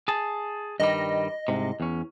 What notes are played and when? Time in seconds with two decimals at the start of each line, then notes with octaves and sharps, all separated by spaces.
0.08 G#4 A5
0.80 G2 D#3 G3 D#5
1.48 C2 G#2 C3
1.80 E2 C#4